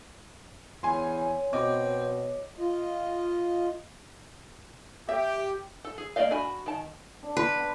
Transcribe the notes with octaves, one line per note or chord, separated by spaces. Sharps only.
E2 C#5 G#5 C6
B2 C4 D#5 D6
F4 D#5
G4 E5
A4
G#4
A#3 D4 D5 D#5 F5
D4 F#4 G#5 B5
D#3 A5
D4
B4 C5
B3